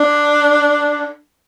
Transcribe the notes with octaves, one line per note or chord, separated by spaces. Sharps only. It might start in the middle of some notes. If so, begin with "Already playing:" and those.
Already playing: D4